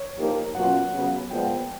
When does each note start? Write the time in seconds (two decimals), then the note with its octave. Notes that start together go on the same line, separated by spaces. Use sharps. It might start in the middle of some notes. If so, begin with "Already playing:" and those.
Already playing: C#5
0.16 F3 A#3 D#4 G4 A#4
0.55 B2 F#3 A#3 C#4 F4 F#5
0.92 C#3 F#3 B3
1.30 A#2 F3 G#3 B3 G5